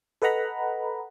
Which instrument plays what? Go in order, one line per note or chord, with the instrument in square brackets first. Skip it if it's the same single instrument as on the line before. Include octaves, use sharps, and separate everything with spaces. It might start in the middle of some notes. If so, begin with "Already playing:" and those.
[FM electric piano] A4 B4 D#5 F#5 A#5 B5